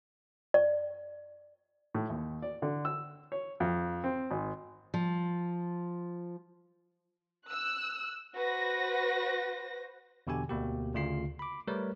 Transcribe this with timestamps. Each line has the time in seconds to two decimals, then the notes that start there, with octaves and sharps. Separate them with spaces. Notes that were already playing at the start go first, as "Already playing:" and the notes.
0.54 D5
1.94 A2
2.10 D#2
2.42 D5
2.62 D3
2.85 E6
3.32 C#5
3.60 F2
4.04 C4
4.31 G#1
4.94 F3
7.47 E6 F#6
8.37 F#4 B4 C5 A#6
10.27 E2 B2 D3 G4 G#5
10.49 D2 B2 A#3 G4
10.94 D2 C#3 F4 C7
11.39 B5 D6
11.67 G3 A3 A#4 B4 C#5